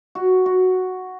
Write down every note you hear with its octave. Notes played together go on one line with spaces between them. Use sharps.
F#4
F#4